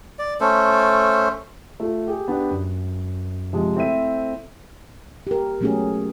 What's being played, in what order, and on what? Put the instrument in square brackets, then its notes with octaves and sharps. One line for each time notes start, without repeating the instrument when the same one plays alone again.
[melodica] D5
A3 C#4 A4 C5
[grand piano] A3 F4
G4 G#4
B3 D4 G4
F#2
C3 F3 G#3
A3 C4 E4 C5 E5 D#7
[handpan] G4 A#4
F#3 A3 B3 C#4 F#4 G#4